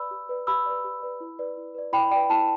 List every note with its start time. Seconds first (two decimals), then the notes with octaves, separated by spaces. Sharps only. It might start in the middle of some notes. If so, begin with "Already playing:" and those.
Already playing: B4 D5 B5 E6
0.11 G4
0.29 B4 D5
0.47 G4 B5 E6
0.66 B4 D5
0.84 G4
1.02 B4 D5
1.20 E4
1.39 B4 D5
1.57 E4
1.74 B4 D5
1.93 E4 G5 B5
2.11 B4 D5 G5
2.30 E4 A5